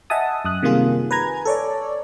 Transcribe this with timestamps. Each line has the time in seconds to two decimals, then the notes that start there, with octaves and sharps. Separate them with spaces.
0.10 D#5 E5 F#5 G#5 A5 D#6
0.45 F#2 D#6 F#6
0.62 C3 D#3 G3 A#3 F4 G#4
1.11 B4 G#5 A#5 G#6
1.45 A4 C#5 D5